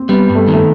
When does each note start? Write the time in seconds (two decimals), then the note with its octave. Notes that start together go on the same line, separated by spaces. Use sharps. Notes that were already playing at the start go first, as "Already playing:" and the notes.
Already playing: A#3 C4
0.09 G3 B3
0.29 G2
0.35 A3
0.48 D#3
0.54 A3